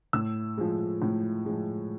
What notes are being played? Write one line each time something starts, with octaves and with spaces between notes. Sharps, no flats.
A2 E6
F3 G#3
A2
F3 G#3